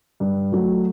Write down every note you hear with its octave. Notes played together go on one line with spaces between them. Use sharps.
G2
F#3 A3